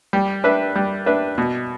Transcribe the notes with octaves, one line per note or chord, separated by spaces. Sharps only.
G3
D4 B4 E5
G3
D4 B4 E5
B2